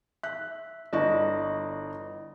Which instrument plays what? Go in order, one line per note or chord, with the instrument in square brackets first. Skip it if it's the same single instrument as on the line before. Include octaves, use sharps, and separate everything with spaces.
[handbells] E5 [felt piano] F#6
[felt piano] G1 D5 C#6 [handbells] E4 D#5